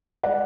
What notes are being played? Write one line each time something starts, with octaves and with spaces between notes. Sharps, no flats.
G#3 D5 F#5